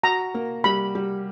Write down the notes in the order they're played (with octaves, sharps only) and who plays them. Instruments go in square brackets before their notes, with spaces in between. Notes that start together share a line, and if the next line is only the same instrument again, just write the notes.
[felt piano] F#4 [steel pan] A#5
[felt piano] A#3
[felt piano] G3 [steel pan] B5
[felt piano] G3